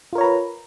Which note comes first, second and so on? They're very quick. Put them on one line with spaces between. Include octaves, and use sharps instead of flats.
F4 A#4 C#5 A#5 B4